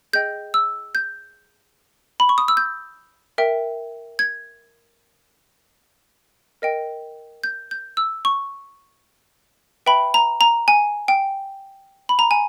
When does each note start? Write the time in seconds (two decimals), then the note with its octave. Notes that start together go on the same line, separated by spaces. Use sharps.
0.13 G#4 D#5 G5 G6
0.54 E6
0.95 G6
2.20 B5
2.29 C#6
2.38 D#6
2.48 E6
2.57 G6
3.38 A#4 E5 G5
4.19 G#6
6.62 A#4 D#5 G5
7.44 G6
7.71 G6
7.97 E6
8.25 C#6
9.86 B4 E5 G5 B5
10.14 A#5
10.41 A#5
10.68 G#5
11.08 G5
12.09 B5
12.19 A#5
12.31 G#5